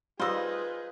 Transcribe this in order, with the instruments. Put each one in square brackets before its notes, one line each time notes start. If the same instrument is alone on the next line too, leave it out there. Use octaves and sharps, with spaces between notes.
[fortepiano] G3 E6 [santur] D#4 F4 [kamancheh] G#4 B4 [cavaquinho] C5 D#5